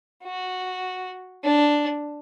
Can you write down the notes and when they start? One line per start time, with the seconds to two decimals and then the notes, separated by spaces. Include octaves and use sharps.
0.24 F#4
1.43 D4